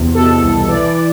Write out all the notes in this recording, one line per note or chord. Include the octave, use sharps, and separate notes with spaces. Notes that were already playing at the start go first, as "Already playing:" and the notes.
Already playing: E2 C3
B2 A4
C2
E3 D5